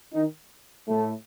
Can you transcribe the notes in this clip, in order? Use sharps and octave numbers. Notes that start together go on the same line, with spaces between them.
D#3 D#4
A2 A3